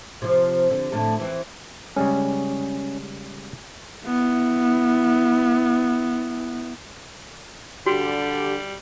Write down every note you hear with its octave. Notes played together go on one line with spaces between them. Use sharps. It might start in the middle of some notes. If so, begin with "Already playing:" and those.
C3 F3
D3
A2 D3 A3
E3 C4
C#3 G3 G#3 C#4
B3 E4
D3 G3 F#4 G4